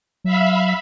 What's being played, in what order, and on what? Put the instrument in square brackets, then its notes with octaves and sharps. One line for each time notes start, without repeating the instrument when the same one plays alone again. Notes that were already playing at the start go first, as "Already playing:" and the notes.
[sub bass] F#3 [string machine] E5 F5 B5